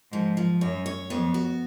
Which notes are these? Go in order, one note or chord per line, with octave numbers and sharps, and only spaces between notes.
G#2 F3
F3
F#2 C#5
C#5
F2 B3
F#4